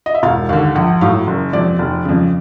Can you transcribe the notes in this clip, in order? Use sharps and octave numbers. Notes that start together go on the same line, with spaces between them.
D#5
E5
E1 F5
D#2 D3 F5
A#1 F#5
A2 F#3 F5
F#1
F2 C3 D5
F1
F2 C#3